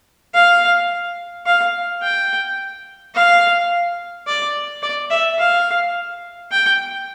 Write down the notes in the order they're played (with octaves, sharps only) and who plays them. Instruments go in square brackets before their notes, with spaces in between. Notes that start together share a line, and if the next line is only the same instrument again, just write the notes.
[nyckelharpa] F5
F5
G5
F5
D5
D5
E5
F5
G5